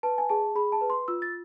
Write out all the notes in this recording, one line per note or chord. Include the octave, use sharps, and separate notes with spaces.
B4 A5
G#5
G#4 A5
G#4 B5
A5
B4
C6
F4 E6
A6